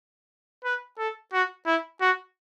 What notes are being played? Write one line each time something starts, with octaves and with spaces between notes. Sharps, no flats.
B4
A4
F#4
E4
F#4